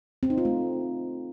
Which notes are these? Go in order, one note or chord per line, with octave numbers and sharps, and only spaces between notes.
C4
D#4
F4
A3